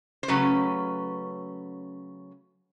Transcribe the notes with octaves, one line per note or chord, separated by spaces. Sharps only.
C5
C#3 F#3 A3 C#4 B4